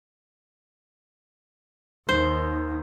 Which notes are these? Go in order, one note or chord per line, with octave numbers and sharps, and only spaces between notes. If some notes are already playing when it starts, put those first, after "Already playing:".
D#2 D#3 C5